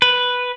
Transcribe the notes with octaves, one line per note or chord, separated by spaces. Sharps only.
B4